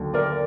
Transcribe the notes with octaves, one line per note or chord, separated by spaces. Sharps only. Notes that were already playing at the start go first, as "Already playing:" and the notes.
Already playing: D#2 D3 F#3
A#4 D5